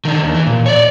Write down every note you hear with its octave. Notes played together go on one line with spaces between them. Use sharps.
D3 D#3
D#2
E3
A#2
C#5 D5